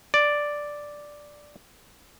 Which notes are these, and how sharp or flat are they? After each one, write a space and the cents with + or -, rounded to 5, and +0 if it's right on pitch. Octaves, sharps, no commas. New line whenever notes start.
D5 +0